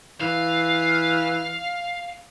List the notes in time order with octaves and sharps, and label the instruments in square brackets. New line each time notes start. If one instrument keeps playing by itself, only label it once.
[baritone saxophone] E3 [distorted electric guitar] F5